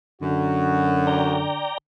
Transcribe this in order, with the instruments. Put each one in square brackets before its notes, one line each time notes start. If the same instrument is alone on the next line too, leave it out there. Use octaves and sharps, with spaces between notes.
[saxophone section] F#2 [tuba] D3 [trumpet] F#4
[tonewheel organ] D5 G5 A#5